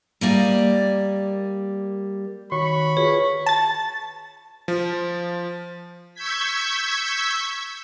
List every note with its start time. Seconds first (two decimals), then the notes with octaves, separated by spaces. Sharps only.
0.21 G3 A#3 D5 D#5
2.52 D#3 F#4 C#5 B5 C#6
2.97 F4 G#4 B4 C#5
3.46 A5 A6
4.68 F3
6.14 C#6 E6 G6 G#6 B6